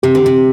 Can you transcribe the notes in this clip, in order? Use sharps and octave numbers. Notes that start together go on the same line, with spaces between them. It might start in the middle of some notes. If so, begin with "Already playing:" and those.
C3 G4
D3
C3